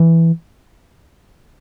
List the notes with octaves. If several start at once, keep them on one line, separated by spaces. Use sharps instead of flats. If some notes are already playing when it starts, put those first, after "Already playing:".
Already playing: E3